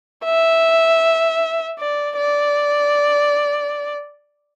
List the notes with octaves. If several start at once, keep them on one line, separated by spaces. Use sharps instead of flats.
E5
D5
D5